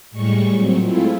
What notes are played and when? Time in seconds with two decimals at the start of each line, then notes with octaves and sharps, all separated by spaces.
0.11 A2 G3 G#3 C#6
0.53 A#2 F#3 C4
0.82 G#3 A3 C4 E4 F4